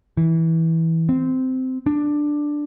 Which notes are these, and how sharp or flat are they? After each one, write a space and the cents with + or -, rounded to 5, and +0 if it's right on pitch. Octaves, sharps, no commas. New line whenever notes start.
E3 -15
C4 -15
D4 +5